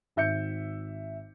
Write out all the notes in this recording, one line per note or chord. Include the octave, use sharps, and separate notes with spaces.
G#1 E5 G6 C#7